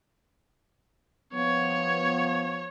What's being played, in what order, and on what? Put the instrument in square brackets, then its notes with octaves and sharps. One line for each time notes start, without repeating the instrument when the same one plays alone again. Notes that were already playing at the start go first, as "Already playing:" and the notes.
[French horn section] F3 B3 [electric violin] C#5